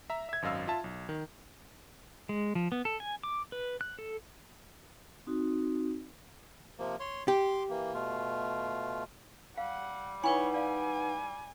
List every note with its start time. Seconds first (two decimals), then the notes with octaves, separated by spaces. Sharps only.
0.10 E5 A#5
0.29 E5 G#6
0.42 G#1 F#2 D#5 F5 E6
0.67 F4 E5 A5
0.84 B1
1.09 D#3
2.29 G#3
2.55 F3
2.72 B3
2.85 A4
3.00 G#5
3.23 D6
3.52 B4
3.81 F#6
3.99 A4
5.27 C4 D#4 F#4
6.79 C3 F3 A#3
7.00 C#5 C6
7.28 G4 C6 D6
7.70 E3 A#3
7.94 B2 A3 F4
9.58 G3 F5 F#5
10.24 D#4 E4 B4 C#5 F#5 G#5 B5
10.54 D5 F5 G#5